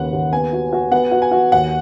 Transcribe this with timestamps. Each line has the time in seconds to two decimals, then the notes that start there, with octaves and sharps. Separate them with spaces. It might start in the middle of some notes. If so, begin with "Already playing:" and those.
Already playing: D#2 C#3 B4 F#5
0.13 D#2
0.33 B3 G#5
0.53 F#4
0.73 F#4
0.91 B3 F#5
1.11 F#4
1.22 G#5
1.31 F#4
1.52 D#2 F#5